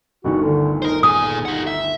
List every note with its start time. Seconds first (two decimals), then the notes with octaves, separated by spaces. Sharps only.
0.24 G1 D2 D#3 F#4
0.42 D3
0.82 D#4 A#4 C5
1.03 A#2 G#4 G#5 D#6
1.45 D#4 G4 F#5
1.67 E5